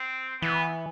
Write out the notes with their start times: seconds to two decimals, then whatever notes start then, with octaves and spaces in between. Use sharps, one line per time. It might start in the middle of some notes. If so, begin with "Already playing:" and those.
Already playing: C4
0.41 E3 B3